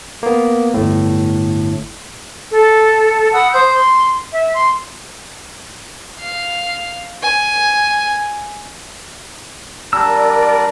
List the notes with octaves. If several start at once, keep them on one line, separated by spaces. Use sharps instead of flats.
A#3 B3
G1 A2
A4
F#5 B5 D#6 E6
C5 D#6 G6
C6
E5
C6
F5
G#5
G3 D4 A#4 D5 A#5 E6